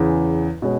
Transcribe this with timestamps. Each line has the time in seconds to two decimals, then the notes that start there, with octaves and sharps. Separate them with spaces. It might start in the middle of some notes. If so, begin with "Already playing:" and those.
Already playing: E2 C#3 E3
0.62 B2 G#3 C#4